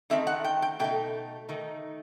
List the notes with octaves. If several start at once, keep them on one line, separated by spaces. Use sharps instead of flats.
D#3 A3 C4 D#4 E5
F#5
G5
G5
B2 A3 D#4 G5
D#3 A3 D#4